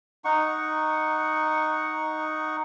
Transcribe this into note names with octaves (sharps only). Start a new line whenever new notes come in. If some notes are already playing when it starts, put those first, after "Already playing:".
D#4 F#5 C#6